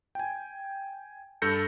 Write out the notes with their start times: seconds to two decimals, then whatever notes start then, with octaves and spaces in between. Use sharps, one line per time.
0.15 G5 G#5
1.42 G2 A4 G6 A#6 C#7